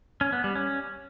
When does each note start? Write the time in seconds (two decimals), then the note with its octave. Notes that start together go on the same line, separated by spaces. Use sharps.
0.21 C#4
0.33 B3
0.44 G3
0.55 C#4